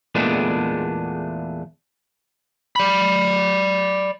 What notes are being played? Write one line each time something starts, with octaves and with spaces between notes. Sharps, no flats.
E2 A#2 G#3 A3 B3 D4
D5 B5